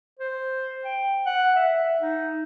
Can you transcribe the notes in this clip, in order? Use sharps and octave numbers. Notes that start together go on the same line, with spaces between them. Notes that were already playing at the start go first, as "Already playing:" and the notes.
C5
G5
F#5
E5
D#4